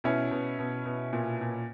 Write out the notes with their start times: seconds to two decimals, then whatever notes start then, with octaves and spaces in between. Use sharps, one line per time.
0.04 B2 C#4 E4
0.31 B2
0.59 B2
0.85 B2
1.13 A#2
1.41 A#2